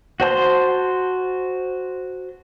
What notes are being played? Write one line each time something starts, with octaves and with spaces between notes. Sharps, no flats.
F#4 C5 A5 C6